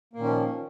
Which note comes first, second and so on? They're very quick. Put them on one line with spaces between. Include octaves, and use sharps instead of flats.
A#3 A#2 D#3 C#4 F3